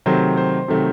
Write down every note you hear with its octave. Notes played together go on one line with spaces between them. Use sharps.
C3 D#3 F#3 A3 C5
C5
C3 D#3 F#3 A3